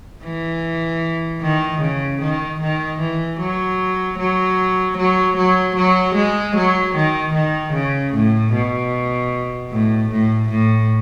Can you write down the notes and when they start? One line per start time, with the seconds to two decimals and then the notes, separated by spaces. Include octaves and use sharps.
0.24 E3
1.42 D#3
1.81 C#3
2.22 D#3
2.61 D#3
3.00 E3
3.40 F#3
4.19 F#3
4.98 F#3
5.37 F#3
5.76 F#3
6.15 G#3
6.56 F#3
6.96 D#3
7.34 D#3
7.73 C#3
8.14 A2
8.53 B2
9.71 A2
10.11 A2
10.50 A2